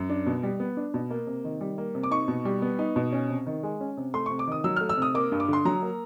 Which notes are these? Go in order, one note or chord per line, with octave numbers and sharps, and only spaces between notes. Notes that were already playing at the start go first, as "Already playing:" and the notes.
Already playing: F#2
D4
B2
G3
B3
D4
B2
A#3
C3
D#3
G3
A#3
C3
D6
D#4 C#6
B2
G3
B3
D#4
B2
C#4
C3
D#3
G#3
C#4
C3
A3 C6
C3 C#6
D6
D#3 D#6
F#3 E6
A3 F6
E6
C3 D#6
A#3 D6
G2
D6
D3 C6
F#3 A#5
A#3